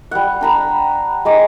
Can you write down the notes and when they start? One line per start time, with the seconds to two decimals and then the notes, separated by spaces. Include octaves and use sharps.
0.11 G3 F#5
0.41 D4 A#5 B5
1.25 G#3 A#5 D6